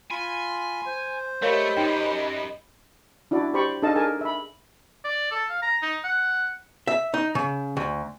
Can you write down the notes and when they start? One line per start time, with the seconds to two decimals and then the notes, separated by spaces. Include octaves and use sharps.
0.11 F4 G#5 B5 C6
0.86 C5
1.42 A3 G4 A#4 C#5 D#5 F5 B5
1.77 F#2 D#4 G5
3.31 D4 E4 F#4 D5
3.54 G4 C5 D5 B5 C#6
3.82 D4 D#4 A4 D#5 F5 A5
3.96 G#4 A#4 G#5 A5
4.21 E5 B5
5.04 D5
5.31 A4
5.50 F5
5.62 A#5
5.82 D#4
6.04 F#5
6.87 E5
7.14 D#4
7.35 C#3
7.77 D2